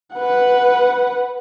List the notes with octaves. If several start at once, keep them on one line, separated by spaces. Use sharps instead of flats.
B4 F#5